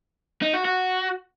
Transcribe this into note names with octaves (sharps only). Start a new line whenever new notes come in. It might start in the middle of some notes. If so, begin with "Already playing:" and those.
D#4
F#4
F#4